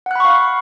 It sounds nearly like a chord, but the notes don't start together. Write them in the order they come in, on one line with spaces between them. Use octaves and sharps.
F#5 F#6 B5 C#6 F5